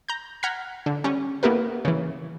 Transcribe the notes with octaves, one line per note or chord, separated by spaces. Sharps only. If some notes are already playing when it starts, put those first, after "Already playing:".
A#5 G6
F#5 A#5 F6 G6 G#6 B6
D3
G3 C#4
A#3 B3 E4 G4 A#4 B4
C#3 E3